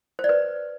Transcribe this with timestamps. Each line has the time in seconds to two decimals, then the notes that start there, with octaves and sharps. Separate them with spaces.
0.19 C5
0.24 D5
0.29 B4